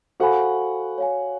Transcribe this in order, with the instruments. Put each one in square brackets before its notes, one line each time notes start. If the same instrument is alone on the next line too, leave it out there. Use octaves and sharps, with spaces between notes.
[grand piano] F#4 F#5 [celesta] A4 C5 F5 G#5 B5
[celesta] C#5 F5 G#5